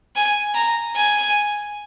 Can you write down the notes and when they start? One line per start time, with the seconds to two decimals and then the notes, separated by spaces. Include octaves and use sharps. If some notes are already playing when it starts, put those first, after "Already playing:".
0.16 G#5
0.55 A#5
0.96 G#5